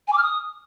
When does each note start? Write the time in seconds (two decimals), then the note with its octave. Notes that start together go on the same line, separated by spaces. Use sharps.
0.07 G#5
0.12 D6
0.17 F6
0.22 D#6